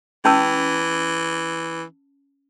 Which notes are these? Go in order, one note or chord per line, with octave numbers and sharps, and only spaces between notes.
E3 C#4 A5 E6